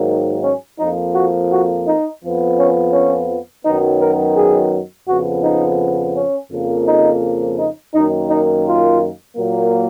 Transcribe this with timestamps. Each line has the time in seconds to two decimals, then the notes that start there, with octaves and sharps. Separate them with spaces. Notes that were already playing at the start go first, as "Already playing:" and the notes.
Already playing: G#2 D#3 F#3 A#3
0.43 C#4
0.79 F2 F3 A#3 D#4
1.15 F#4
1.51 F#4
1.87 D#4
2.22 F2 F3 B3
2.58 C#4
2.93 C#4
3.65 F#2 D#3 F#3 B3 D#4
4.01 A#4
4.36 G#4
5.08 F2 C#3 F3 B3 F#4
5.44 D#4
6.15 C#4
6.52 F2 C#3 F3 A#3
6.87 D#4
7.58 D#4
7.94 F#2 D#3 A#3 D#4
8.31 D#4
8.66 F4
9.37 A#2 F#3 A#3